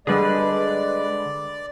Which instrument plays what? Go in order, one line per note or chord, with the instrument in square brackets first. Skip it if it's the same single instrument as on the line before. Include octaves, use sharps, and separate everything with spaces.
[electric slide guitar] D3 B4 [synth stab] G3 G#4 [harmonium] G#3 [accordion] D5